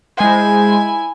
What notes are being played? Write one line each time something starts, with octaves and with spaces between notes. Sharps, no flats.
G#3 E4 C5 G#5